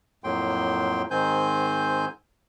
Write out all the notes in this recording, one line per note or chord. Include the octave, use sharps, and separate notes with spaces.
F2 A2 F#3 A#3 G5 C6
G#2 D#3 C4 C5 G#5 G6